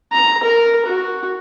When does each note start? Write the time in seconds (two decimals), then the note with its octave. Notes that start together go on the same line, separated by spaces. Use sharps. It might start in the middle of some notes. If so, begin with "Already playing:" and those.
0.12 A#5
0.43 A#4
0.85 F#4